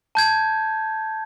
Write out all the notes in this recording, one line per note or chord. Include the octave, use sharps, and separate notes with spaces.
A5 G6 G#6